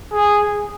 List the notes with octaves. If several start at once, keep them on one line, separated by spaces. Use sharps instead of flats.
G#4